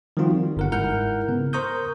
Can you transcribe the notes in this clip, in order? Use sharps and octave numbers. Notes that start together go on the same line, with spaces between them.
D#3 F3 G3 C4 F4 F#4
G3
G1 A#4 F#5
G#2 E4 A#4 F#5 F6 G6
C#3 B3
A#4 C5 A#5 C#6 D#6 G6